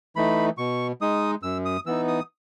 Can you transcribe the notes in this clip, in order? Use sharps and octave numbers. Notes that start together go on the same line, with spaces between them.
E3 A3 D#4 B5
B2 C#6
G#3 D#4 D#6
F#2 E6
D#6
E3 B3 D#4 E6
D#6